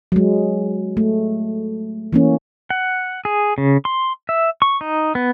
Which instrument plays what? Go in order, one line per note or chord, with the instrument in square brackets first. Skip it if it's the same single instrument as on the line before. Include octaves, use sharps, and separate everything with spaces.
[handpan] F#3 G#3
A3
E3 A#3 C#4
[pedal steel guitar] F#5
G#4
C#3
C6
E5
C#6
D#4
B3